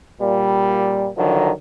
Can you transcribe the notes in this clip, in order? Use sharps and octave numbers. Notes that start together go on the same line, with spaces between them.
A#2 G3
D3 D#3 F3 F#3